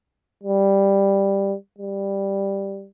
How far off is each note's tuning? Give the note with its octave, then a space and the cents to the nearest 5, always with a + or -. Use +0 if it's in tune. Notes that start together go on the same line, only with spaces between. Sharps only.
G3 +5
G3 +5